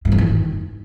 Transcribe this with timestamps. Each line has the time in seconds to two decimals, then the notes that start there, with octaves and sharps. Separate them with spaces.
0.05 G#2
0.12 F2
0.18 D#3